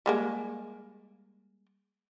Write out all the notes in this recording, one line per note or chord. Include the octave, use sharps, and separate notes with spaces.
G3 G#3 A#3